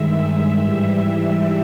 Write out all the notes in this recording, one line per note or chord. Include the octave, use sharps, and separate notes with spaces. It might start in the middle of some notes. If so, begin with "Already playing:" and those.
Already playing: G2 D#3 G#3 E5
G#2 E3 G3 E5